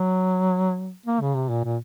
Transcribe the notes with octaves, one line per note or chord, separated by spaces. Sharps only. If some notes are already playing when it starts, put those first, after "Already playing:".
Already playing: F#3
A#3
C#3
C3
A#2
A#2